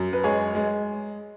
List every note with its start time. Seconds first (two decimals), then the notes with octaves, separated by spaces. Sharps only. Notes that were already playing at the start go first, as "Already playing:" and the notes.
Already playing: F#2
0.13 B4
0.23 G#3 G#4 C#5
0.55 G#3